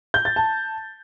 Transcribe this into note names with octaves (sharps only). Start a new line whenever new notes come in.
G6
A6
A5